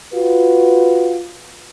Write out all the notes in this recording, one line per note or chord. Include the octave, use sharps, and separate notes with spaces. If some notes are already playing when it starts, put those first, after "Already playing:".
F4 F#4 B4